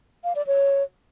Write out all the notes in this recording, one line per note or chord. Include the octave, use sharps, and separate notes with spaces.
F5
D5
C#5